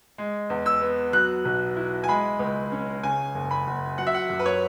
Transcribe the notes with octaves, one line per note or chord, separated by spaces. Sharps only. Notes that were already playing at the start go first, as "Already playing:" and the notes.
G#3
E2
E6
B3
F#3 F#6
B1
E4
G#5
G#3 B5
C#2
C#4
C#3 G#5
F#1
B5
F#1
F#3 F#5
E5
F#5
F#2
B4
C#5